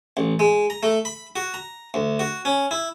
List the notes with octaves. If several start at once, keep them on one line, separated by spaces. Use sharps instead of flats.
A1
G#3
A#5
A3
B5
F#4
A#5
D2
F#4
C#4
E4